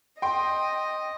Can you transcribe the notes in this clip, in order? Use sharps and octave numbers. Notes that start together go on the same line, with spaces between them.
D#5 G5 C6